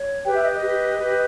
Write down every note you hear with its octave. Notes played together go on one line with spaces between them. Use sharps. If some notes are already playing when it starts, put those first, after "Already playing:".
Already playing: C#5
G4 B4 G5
E5
D#5
D#5
G4 B4
G4 B4